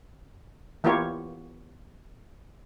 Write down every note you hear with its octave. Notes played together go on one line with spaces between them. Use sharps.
E3 A#3 B3 F4 G4 C#5